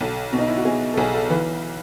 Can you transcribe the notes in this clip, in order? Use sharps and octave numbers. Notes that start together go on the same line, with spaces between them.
B1 A4
B2
D#4
E4
F#4
B2 G#4
A4
B1 G#4
A4
E3 B4